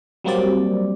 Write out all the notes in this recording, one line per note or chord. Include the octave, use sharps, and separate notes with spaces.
F#3 G3 A#3 C4 G4 D5